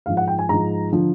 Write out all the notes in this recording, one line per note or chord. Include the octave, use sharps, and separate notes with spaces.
G#2 F3 F5
F#5
G5
G#5
G#2 F3 A#5
D3 F3